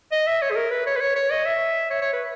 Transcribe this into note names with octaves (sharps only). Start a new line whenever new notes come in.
D#5
E5
C#5
G#4
A#4
B4
C#5
B4
C#5
C#5
D#5
E5
C#5
C#5
B4